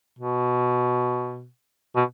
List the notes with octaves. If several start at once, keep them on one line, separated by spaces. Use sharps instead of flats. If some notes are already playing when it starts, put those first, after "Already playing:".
B2
B2